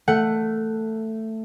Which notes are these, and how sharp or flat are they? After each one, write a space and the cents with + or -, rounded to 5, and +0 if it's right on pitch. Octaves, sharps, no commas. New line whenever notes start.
A3 +10 F#5 +0